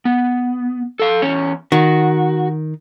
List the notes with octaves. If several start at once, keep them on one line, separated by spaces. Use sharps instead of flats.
B3
A4 F5
E2 C#4 C#5
D#3 F#4